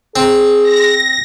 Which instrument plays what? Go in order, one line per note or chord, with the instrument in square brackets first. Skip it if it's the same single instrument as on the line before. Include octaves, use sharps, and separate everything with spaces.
[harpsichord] C4 [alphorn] G#4
[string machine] A#6